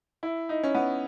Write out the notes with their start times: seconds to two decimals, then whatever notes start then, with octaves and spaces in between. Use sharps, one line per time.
0.23 E4
0.49 D#4
0.63 C#4
0.75 B3